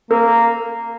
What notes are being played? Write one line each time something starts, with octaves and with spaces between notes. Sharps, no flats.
A#3 A#4